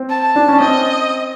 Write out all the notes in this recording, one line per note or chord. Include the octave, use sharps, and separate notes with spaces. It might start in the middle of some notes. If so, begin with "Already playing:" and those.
Already playing: C4
A5
D4
C#4
C4 D#5